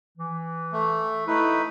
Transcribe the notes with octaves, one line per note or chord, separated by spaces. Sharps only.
E3
A3
A3 D#4 E4 B4